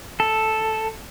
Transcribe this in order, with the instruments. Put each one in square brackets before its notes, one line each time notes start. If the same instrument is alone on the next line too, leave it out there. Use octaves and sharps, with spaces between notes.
[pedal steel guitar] A4